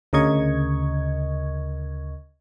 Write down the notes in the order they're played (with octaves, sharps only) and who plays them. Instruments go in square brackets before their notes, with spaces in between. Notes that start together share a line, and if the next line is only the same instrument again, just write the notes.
[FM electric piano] D2 C#3 A#4 D#5 C#6 G#6